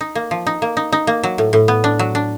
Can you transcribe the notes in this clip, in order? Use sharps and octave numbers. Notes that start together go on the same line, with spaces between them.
D#4
A#3
F3
D#4
A#3
D#4
D#4
A#3
F#3
A2
A2
B3
D4
F#3
D4